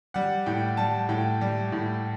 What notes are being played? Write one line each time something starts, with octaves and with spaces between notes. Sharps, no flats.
G3 F#5
A2 G5
G3 A5
A2 G5
G3
A2